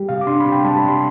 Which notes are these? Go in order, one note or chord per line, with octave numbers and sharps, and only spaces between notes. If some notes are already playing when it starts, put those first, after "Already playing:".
Already playing: G3 G4
C3 F5
D6
D4 C6
B5
C3
G5
G3 A5
B5
C3
C6